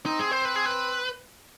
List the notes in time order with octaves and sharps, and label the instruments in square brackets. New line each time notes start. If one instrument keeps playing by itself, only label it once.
[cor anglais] C4 [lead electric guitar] D#4
[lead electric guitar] G#4
C5
B4
G#4
B4